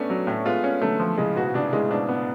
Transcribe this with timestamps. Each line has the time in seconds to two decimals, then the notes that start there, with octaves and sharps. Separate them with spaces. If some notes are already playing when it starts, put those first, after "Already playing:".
Already playing: A3 B3 C#4 D4
0.10 F#3
0.27 A2 A3 C#4
0.46 G#3 B3 F4
0.64 C#4
0.82 D3 F#3 A3
1.00 F3
1.18 A2 C#3 G#3
1.36 G#2 B2 F#4
1.54 A2 C#3 D4
1.72 A2 C#3 G#3
1.91 G#2 B2 D4
2.09 B3